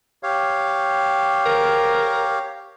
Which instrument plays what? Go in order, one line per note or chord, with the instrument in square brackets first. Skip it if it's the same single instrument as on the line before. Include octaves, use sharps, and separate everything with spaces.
[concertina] G4 C#5 F5
[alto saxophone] A#4